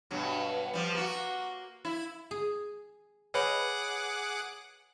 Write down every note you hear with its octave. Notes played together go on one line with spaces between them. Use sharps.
G2 B2 F#3
F3 G3
A#3 F#4
E4
G#4
G#4 B4 C#5 D#5 F#5 B5 D6